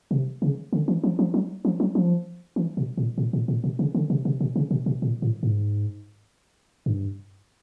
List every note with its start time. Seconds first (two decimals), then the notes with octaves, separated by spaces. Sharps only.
0.11 C3
0.42 C#3
0.73 D3
0.88 E3
1.04 F3
1.19 F3
1.34 F#3
1.65 F3
1.80 F#3
1.95 F3
2.56 E3
2.77 B2
2.97 A#2
3.18 A#2
3.33 A#2
3.48 A#2
3.64 B2
3.79 C#3
3.95 D3
4.10 C3
4.25 C3
4.41 B2
4.56 C#3
4.71 B2
4.86 B2
5.02 A#2
5.22 A2
5.43 G#2
6.86 G2